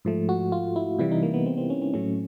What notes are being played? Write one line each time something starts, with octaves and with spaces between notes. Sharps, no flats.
G#2 F3 A3
F#4
F4
E4
C3 E3 G3 E4
D#4
A#3
B3
C4
C4
C#4
C#4
A2 F#3 A3 C#4